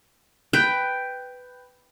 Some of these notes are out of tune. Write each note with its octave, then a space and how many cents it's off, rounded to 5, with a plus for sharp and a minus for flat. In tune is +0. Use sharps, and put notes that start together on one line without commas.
B4 +10 G5 +0